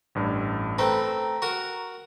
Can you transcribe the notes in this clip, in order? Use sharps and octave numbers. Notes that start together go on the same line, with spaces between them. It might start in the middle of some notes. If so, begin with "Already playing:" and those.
A1 G2
A3 C4 B4 A#5
F#4 A#4